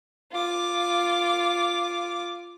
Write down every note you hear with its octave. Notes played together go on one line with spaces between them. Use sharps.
F4 D6